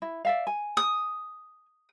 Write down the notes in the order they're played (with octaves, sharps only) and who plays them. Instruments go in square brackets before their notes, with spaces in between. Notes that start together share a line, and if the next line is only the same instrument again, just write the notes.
[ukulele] E4
D5 E5 F5
G#5
[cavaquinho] D#6